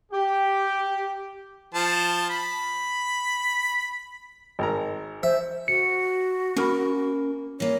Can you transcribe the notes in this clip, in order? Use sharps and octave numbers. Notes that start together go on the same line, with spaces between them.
G4
F3 C5 A5
B5
G#1 A#4 A#5
C5 E5
F#4 C#7
A#3 C#4 A#4 B5
E3 A#3 C#5